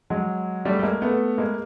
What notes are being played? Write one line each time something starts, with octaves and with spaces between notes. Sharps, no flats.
F#3 G#3
G3 A3
A3
G#3 A#3
A3 B3
G#3 A#3